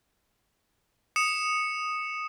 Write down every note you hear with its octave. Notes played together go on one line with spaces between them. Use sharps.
D#6 C#7 E7